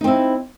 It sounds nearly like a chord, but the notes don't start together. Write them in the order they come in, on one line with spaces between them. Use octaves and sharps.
D#4 C4 E4